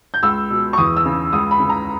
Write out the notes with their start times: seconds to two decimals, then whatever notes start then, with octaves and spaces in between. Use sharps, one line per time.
0.14 G6
0.23 C#2 E6
0.50 B2
0.73 C#6
0.78 E2 D#6
0.97 E6
1.05 C#3
1.33 C#2 D#6
1.51 B5
1.60 C#3
1.69 A#5